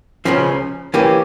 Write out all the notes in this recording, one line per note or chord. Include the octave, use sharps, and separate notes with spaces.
C#2 C#3 F3 C#4
E3 A#3 C#4 G4